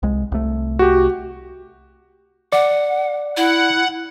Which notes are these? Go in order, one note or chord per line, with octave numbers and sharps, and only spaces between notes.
C2 G#3
C2 A3
F#4 G4
D5 F#5
E4 F#5